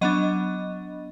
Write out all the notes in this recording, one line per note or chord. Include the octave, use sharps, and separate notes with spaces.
F#3 B3 D4 D#5